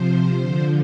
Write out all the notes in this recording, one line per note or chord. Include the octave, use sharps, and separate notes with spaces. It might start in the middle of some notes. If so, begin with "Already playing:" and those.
Already playing: C3 F3 C5
D3 F3